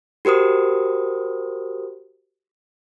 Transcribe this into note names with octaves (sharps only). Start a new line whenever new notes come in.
F#4 G4 A#4 C5 D#6